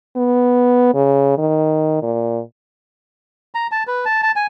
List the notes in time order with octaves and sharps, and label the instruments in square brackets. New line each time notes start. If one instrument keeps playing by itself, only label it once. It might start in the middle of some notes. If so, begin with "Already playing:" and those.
[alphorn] B3
C#3
D#3
A#2
[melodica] A#5
A5
B4
A5
A5
G#5